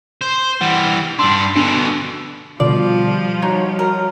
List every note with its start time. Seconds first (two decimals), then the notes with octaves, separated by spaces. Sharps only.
0.21 C5
0.61 E3 G3 F#5
1.19 G2 D4 C6 E6
1.56 B2 D3 D4
2.60 B2 D3 F3 G3 F4 D5
3.42 D#4 F#4 C#5
3.79 A#4